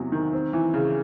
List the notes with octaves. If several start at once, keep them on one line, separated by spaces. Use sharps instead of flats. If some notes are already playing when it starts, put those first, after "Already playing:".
Already playing: E2 C3 F#3
D#3
C4
E3
C#3